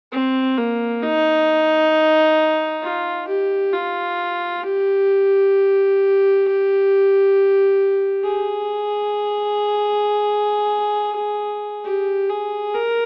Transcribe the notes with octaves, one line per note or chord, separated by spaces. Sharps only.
C4
A#3
D#4
F4
G4
F4
G4
G#4
G4
G#4
A#4